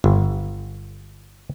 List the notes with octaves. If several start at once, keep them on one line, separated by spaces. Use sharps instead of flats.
G1